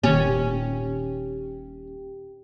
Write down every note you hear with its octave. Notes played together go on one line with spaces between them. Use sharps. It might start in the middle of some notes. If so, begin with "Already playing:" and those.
D#1 A#2 D#3 C#4 G4